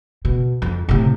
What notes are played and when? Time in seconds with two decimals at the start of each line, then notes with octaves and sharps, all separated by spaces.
0.25 B2
0.62 F2
0.89 A2 C3